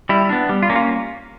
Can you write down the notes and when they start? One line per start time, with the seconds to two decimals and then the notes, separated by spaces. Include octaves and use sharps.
0.09 G3 E4
0.29 B3 D4
0.49 G3
0.63 F4
0.70 A#3 C#4
0.76 F4